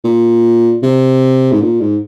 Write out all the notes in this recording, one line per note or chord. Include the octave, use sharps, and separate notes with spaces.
A#2
C3
G#2
A#2
G#2